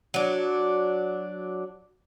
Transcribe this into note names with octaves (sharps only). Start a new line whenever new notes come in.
F#3 D4